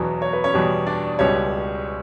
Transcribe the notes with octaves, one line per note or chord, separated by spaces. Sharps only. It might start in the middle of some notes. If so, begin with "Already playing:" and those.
Already playing: E2 B2 F#3 C#4
C#5
B4
C#4 C#5
E2 B2 G3
D4 D5
C#2 B2 G3 C#4 C#5